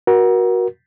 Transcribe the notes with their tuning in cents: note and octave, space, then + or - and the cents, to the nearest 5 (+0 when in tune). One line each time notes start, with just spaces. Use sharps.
F#4 +0 A#4 +30